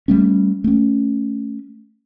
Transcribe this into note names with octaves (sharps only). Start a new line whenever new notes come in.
G3 A3 C#4
A3 C#4